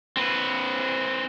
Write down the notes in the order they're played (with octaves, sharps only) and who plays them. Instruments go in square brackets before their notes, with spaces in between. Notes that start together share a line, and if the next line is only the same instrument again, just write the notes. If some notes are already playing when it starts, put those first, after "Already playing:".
[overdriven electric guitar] C4 B4